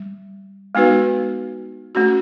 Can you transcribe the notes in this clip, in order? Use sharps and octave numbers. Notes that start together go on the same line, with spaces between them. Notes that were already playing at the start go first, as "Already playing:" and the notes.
Already playing: G3
G#3 B3 D#4 F#4 B4
A3 C#4 F#4